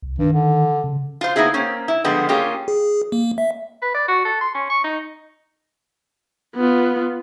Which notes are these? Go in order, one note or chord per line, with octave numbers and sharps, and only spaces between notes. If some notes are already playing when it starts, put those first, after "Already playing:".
C2
G2 D#3
D3
C#3
F4 C5
A#3 B3 D#4 E4 G#4
A#3 C4 C#4
E4
D3 F3 G3 G#3 B3
A#3 C#4 F4 G4 G#4
G#4
A#3
E5
B4
D5
F#4
A4
C6
C#4
C#6
D#4
B3 F4